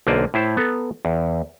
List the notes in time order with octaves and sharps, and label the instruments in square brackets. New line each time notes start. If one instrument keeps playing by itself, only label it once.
[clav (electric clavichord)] B1 D3 A#3 C5 D5 G#5
A2 E4 C5 E5 A5
B3 A4 A#5
E2